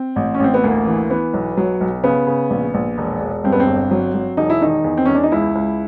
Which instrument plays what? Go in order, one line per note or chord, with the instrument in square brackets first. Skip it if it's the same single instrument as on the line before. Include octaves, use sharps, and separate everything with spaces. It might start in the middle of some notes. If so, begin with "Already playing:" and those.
Already playing: [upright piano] C4
A1
C#4
A1 C4
B3
D2 A#3
E3
E3 B3
B1
F#3
B1
C#3 B3
C#3
A#1
A#1
E1
E1
G2 C4
B3
C4
G1
F#3
F#3
E1 D#4
E4
D#3 D#4
E2
C4
E2 C#4
D4
D#4
C#2 E4
C#2